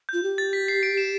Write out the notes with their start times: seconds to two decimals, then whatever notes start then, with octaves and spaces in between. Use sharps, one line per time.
0.09 G6
0.13 F4
0.23 G4
0.38 A6
0.53 B6
0.68 C7
0.83 D7
0.97 E7